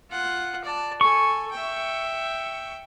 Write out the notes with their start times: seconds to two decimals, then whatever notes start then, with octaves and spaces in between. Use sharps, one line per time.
0.10 F4 F#5
0.64 D5 A5
1.01 A4 G#5 C#6
1.52 E5 G5